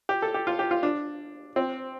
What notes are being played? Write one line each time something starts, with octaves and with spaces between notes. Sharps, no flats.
G4
A4
G4
F4
G4
F4
D4
C4